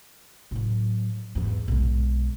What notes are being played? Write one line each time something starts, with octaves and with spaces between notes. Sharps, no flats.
A2 F#3
E2 G#2
B1 G#3